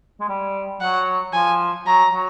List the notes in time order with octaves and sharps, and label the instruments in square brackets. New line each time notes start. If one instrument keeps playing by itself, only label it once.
[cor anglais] G#3
G3
[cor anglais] F#3 [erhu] F#5
[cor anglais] F3 [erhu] G#5
[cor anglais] F#3 [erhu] A#5
[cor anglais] F#3